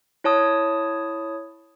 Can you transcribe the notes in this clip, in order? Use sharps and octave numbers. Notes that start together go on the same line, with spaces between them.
E4 C#5 A5 D#6